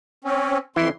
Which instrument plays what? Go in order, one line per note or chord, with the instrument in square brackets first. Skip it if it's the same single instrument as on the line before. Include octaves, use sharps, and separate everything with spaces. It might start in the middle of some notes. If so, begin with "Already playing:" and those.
[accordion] C4 C#4
[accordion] F2 C6 [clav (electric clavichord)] E3 E4